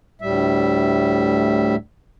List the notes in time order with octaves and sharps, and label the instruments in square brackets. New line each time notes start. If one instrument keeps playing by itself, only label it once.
[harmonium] D2 A2 G3 E5